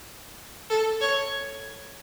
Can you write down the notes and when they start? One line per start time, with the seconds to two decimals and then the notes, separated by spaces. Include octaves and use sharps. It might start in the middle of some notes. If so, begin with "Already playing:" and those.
0.70 A4
1.01 C#5